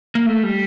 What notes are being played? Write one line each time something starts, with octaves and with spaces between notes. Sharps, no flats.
A#3
A3
G3